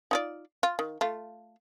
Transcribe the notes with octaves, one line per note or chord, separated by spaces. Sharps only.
D#4 F4 D5
F4
D#3
A3 F4